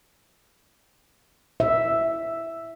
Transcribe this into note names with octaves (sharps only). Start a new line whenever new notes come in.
E5